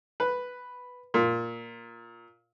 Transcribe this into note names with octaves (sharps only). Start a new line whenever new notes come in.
B4
A#2